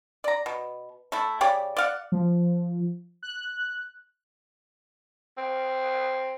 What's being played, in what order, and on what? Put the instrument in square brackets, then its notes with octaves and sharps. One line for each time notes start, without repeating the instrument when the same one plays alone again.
[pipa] D5 A#5
B2
A3 E4
C#3 G4 C#5 D5
D5 F5 F#5
[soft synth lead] F3
F#6
[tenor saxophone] C4